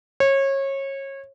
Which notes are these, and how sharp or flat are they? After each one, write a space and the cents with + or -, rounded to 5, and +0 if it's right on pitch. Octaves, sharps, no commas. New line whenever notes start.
C#5 -25